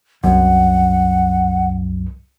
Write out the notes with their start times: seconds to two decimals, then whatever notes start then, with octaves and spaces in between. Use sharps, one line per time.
0.24 C2 F#2 F#5